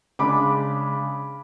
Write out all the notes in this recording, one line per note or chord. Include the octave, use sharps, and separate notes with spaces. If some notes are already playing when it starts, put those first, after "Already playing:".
C#3 G#3 D4 B5 D6